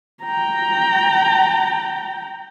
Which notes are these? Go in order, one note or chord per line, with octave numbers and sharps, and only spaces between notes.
G5 A#5